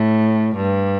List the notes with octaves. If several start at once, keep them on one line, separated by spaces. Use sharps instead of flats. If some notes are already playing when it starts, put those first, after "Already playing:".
Already playing: A2
G2